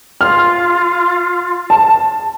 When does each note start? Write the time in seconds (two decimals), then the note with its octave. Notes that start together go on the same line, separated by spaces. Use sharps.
0.21 F4 F6
1.70 A5